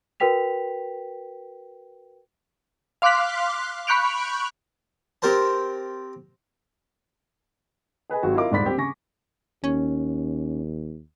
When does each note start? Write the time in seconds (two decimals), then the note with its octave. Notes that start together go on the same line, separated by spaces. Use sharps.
0.20 F#4 A#4 B4 G5 B6 F7
3.02 F5 C6 D6 F6 F#6 B6
3.87 B5 C#6 F#6 G6 D7 F7
5.22 C4 G4 A#4 C5 A5
8.10 G#4 B4 D#5 G#5
8.22 G#1 F#3 F#4 G4
8.35 E4 F4 A#4 D#5 F5 D6
8.52 D#1 G#2 D5 B5 B6
8.65 A#3 C4 G4
8.78 C#3 G#5 C#6 A#6
9.64 D#2 C#4